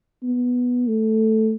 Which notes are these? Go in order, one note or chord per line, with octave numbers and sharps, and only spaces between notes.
B3
A3